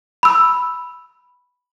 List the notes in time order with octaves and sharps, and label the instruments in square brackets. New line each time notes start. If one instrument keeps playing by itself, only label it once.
[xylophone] B5 E6